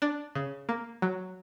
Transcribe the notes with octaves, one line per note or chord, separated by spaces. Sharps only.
D4
C#3
A#3
F#3